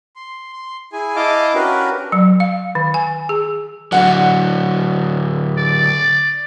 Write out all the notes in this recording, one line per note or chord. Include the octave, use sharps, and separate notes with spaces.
C6
C6
E4 G#4 G#5
E4 D#5 F5 A5 D6
C#4 D4 F#4 G4 A#4 B4
F#3
F5
D#3
G#5
G#4
D3 F#3 F#5
D5